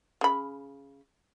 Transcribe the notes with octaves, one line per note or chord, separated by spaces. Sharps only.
C#3 B5